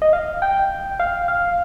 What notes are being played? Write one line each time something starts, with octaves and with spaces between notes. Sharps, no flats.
D#5
F5
G5
F5
F5